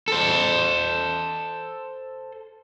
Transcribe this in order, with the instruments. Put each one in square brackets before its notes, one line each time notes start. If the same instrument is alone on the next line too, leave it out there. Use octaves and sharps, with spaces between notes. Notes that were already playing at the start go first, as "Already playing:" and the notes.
[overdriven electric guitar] A4 C5